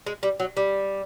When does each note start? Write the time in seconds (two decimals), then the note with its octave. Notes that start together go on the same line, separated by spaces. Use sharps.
0.07 G#3
0.23 G3
0.40 F#3
0.57 G3